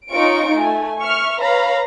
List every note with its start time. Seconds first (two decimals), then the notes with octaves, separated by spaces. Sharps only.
0.10 C#4 D#4 F4 C#6 D7
0.56 A3 G#5
0.99 E5 C#6 F6
1.39 B4 C#5 F5 A#5 B5